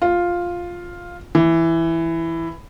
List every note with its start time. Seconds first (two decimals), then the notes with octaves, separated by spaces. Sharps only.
0.02 F4
1.35 E3